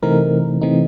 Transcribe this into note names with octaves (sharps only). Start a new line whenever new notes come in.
C3 E3 A3 C4 D#4 A#4
C3 E3 A3 C4 D#4